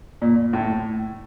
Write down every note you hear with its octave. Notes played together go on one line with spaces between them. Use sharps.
A#2
A2